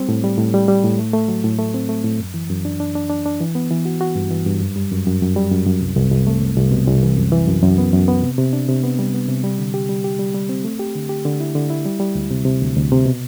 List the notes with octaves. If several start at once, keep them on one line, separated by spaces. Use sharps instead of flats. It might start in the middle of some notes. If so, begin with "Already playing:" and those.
Already playing: G3 C4
A2
G3
A2
G3
G3
A2
A3
A3
F#3
A2
A3
C4
A3
A2
F#2
E3
F#2
D4
D4
D4
D4
D4
E3
B3
E3
F#4
F#4
G2
E3
G2
F#2
G3
F#2
F#2
F#2
G3
F#2
F#2
C2
C2
C2
A3
C2
C2
B2
C2
E3
F#2
E3
F#2
F#2
B3
F#2
B3
C3
C3
D4
C3
B3
G3
B3
C3
G3
D3
G4
G3
G4
G3
G3
C4
A3
G4
D3
G4
D3
E4
D3
E4
G3
G3
D2
C3
C3
D2
D2
C3
B2